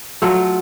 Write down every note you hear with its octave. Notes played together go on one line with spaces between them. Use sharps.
F#3 A3 F4